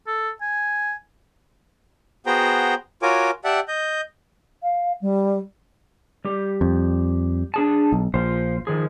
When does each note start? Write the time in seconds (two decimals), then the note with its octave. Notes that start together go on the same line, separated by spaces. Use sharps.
0.07 A4
0.41 G#5
2.26 B3 F#4 G#4 C5 G5 A#5
3.02 F4 F#4 A#4 C#5 G#5 D6
3.44 G4 D5 E5 F#5 A5
3.68 D#5 G6
4.63 F5
5.01 G3
6.25 G3 G4
6.61 F2
7.54 D4 G#4 A5
7.92 B1
8.14 A#1 F4 C5
8.67 D#3 F3 G#4